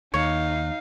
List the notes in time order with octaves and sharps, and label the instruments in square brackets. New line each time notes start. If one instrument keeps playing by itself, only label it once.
[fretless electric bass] D#2 [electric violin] D#4 F5 [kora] C#5